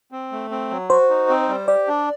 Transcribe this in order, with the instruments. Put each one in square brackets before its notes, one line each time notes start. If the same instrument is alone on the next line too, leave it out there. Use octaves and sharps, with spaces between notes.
[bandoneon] C4
A3
C4
F#3
[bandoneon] F#4 [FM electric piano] C5
[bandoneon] D#4
C4
G3
[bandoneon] G4 [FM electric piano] D5
[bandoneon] D4